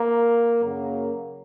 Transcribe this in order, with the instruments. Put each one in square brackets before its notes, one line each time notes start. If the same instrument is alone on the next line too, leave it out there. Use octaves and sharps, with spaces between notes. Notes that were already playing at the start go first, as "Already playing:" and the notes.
Already playing: [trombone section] A#3
F#2 C#3 F#3 A#3